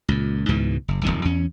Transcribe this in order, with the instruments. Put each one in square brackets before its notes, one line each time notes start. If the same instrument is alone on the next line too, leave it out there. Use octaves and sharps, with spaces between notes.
[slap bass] C#2 A#2
C#2 G#2 B2 E3
F#1
D1 C2 F2 D#3
E2 C#4